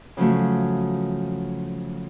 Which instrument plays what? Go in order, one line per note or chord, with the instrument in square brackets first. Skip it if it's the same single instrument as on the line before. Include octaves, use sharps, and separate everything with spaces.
[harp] C#3 F3 F#3 A3